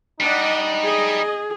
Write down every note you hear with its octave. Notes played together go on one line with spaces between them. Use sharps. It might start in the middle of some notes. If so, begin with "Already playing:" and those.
G3 D4 D#4 D#5 F#5
G#4 D#5